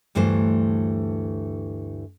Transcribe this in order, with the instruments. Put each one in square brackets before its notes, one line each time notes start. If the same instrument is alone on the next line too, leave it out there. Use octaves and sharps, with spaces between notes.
[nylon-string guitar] D2 G2 E3 A3 C5